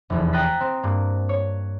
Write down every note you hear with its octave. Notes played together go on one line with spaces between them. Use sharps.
F1 E2
G5 A#5 D#6 F#6 A6 B6
C4
G2 A#3
C#5